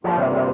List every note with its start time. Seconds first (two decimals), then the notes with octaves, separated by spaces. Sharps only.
0.03 G2 F3 G3 A#3 F4
0.17 C3
0.32 C3